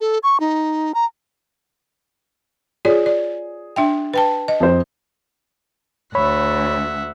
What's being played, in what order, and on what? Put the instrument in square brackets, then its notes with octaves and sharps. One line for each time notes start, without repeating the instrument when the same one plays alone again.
[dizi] A4
C#6
D#4
A#5
[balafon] F4 C#5 D5 [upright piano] G#4
[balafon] D5
D4 E5 G5
B4 G5 A5
D#5
[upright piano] F2 C5
[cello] D2 [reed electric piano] C#5 B5 [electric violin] E5 F#5